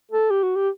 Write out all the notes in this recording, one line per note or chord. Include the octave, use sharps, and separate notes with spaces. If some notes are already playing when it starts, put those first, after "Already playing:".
A4
G4
F#4
G4